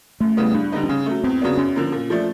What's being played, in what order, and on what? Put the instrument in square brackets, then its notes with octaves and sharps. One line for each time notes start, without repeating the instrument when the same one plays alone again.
[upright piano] F#2 [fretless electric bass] A3
[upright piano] C#3 E3 G3 B3
[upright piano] G2 [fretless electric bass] D4
[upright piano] D3 G3 B3 D#4
[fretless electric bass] D4
[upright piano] C#3 [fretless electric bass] C#4
[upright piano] F#3 A3
[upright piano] E2 [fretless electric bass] C4
[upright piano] C#3 F#3 B3 D4
[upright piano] F#2 [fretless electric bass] C#4
[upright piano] D3 F3 A#3
A#2
F3 A3 D4